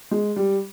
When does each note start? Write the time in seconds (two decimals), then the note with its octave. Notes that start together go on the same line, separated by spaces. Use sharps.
0.11 G#3
0.36 G3